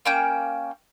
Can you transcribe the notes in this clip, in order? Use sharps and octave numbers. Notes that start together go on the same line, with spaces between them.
A#3 C#4 G5